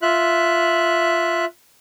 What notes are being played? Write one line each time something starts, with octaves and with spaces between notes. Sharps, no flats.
F4 E5 F#6